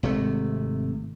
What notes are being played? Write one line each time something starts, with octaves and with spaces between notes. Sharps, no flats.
G#1 C3 A3